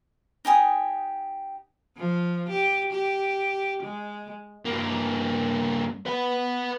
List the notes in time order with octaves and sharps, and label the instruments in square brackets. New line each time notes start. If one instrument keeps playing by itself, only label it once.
[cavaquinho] D#4 G4 G#5 D#6
[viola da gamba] F3
G4
G4
G#3
[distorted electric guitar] G2 A#3
B4 F#5